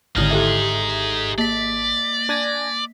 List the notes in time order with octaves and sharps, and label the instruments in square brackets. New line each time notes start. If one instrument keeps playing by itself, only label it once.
[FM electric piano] G#1 [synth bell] D3 E4 F6 [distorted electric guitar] D#4 G#4
[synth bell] G4 A4 E5
[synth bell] A#3 B6 [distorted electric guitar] D5
[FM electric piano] D4 G#5 A#6